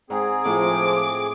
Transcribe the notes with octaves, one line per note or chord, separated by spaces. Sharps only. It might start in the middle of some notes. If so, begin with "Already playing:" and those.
G#2 C4 G#4
A2 F3 D6